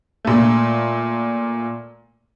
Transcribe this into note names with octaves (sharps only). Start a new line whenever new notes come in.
A#2 A3